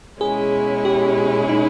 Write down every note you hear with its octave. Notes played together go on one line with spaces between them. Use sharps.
B2 G#3 C#4 E4 G#4
G4
D#4